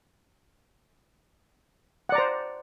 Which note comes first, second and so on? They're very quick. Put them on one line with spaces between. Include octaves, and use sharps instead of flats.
F#5 D5 A#5 C5